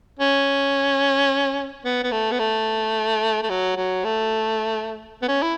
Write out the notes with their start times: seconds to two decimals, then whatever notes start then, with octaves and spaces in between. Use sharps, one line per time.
0.19 C#4
1.85 B3
2.03 B3
2.12 A3
2.32 B3
2.39 A3
3.43 A3
3.50 F#3
3.77 F#3
4.04 A3
5.22 B3
5.28 C#4
5.42 E4